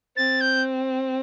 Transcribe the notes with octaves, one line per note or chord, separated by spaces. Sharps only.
C4 A6
G6